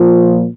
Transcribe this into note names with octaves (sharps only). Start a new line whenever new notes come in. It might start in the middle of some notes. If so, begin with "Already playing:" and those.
Already playing: A#2 F3